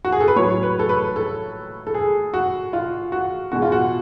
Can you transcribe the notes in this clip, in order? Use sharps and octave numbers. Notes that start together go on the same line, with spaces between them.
F#4
G#4
A4
B4
A2 F#3 C#5
B4
A4
B4
A4
A4
G#4
F#4
F4
F#4
B2 G#3 F#4
F4
F#4